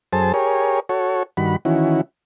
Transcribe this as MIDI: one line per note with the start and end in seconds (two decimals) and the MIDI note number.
0.13 0.32 42
0.13 0.32 68
0.13 0.32 69
0.13 0.32 72
0.13 0.32 81
0.34 0.80 67
0.34 0.80 68
0.34 0.80 70
0.34 0.80 73
0.89 1.23 66
0.89 1.23 69
0.89 1.23 73
1.37 1.56 43
1.37 1.56 51
1.37 1.56 66
1.37 1.56 83
1.65 2.01 51
1.65 2.01 52
1.65 2.01 61
1.65 2.01 64
1.65 2.01 66